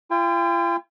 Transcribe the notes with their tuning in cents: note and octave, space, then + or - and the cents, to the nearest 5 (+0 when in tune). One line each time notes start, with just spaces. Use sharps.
F4 -40 G5 +35